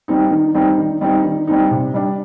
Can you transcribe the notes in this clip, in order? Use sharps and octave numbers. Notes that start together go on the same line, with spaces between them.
G3 C4 D#4
D#3
G3 C4 D#4
D#3
G3 C4 D#4
D#3
G3 C4 D#4
C3
G3 D4